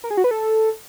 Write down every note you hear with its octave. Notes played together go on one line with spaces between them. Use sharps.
A#4
G#4
F#4
B4
A4